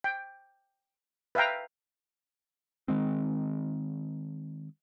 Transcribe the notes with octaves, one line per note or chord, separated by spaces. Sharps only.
G5
B4 E5 F5 G5 A#5
D#3 G#3 C4